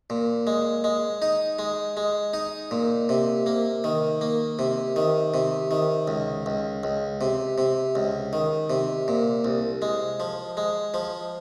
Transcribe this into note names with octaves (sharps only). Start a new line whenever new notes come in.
A#2
G#3
G#3
D#4
G#3
G#3
D#4
A#2
C3
A#3
D#3
A#3
C3
D#3
C3
D#3
C#2
C#2
C#2
C3
C3
C#2
D#3
C3
A#2
C2
G#3
F3
G#3
F3